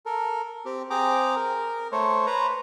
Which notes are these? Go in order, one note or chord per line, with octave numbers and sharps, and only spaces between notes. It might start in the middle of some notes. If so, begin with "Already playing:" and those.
A4 A#4
C4 G4
C4 G#4 G5 A#5 D6
A#4
A3 C5 C#5
B4 C5 A#5